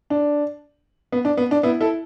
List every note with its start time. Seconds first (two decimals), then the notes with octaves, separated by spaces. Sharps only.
0.10 D4
1.12 B3
1.25 D4
1.37 B3
1.51 D4
1.63 B3 E4
1.81 E4 A4